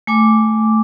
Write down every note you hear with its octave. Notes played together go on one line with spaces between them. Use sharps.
A3 G#5 D6